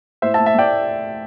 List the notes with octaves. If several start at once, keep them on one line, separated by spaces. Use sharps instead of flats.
A2 C5 E5
E5 A5
A2
E5 A5
A3 D5 G5